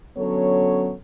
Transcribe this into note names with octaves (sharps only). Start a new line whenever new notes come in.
D3 F#3 B3 C#4 A4 C#5